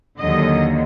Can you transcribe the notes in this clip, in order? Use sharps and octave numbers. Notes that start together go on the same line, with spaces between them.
D#2 D3 F#3 D#5